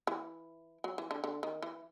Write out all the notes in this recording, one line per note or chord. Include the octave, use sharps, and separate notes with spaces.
E3
F#3
E3
D3
D3
D#3
E3